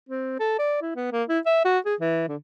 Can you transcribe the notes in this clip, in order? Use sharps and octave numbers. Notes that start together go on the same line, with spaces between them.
C4
A4
D5
E4
B3
A#3
E4
E5
F#4
G#4
E3
D3